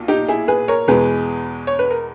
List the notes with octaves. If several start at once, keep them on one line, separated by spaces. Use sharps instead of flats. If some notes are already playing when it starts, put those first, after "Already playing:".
Already playing: B1 A#2
D#4 G4
E4 G#4
G#4 B4
A#4 C#5
E2 B2 G#3 G#4 B4
C#5
B4
A#4